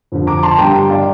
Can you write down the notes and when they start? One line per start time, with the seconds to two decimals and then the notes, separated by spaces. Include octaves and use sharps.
0.12 F2 D3 F3
0.27 A#5 D6
0.43 A5 C6
0.58 G2 D3 G3 D4 G5 A#5
0.89 D5 F5